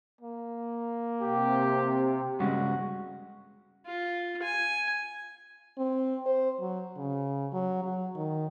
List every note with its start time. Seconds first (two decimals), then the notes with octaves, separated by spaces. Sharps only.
0.21 A#3
1.21 C3 G4
2.40 G2 C#3 G#3 F#4
3.86 F4
4.42 G#5
5.77 C4
6.26 C5
6.60 F#3
6.96 C#3
7.52 F#3
7.84 F#3
8.16 D#3